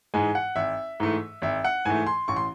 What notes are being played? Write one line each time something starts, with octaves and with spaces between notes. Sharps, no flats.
G#2 E3 G#3 G#5
F#5
G#1 E5
G#2 E3 A3
G#1 E5
F#5
G#2 E3 A3 G#5
C6
A1 C#6
C6